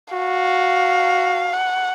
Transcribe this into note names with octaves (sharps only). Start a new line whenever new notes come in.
F#4 F5
F#5